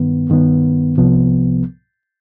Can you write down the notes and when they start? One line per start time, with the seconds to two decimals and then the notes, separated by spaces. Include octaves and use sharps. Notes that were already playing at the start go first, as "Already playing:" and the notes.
Already playing: G2 D#3 B3
0.30 G2 D#3 B3
0.98 C2 C3 F3 B3